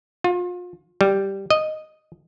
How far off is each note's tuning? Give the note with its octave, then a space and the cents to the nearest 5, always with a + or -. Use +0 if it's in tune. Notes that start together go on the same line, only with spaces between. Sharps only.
F4 +35
G3 -5
D#5 -5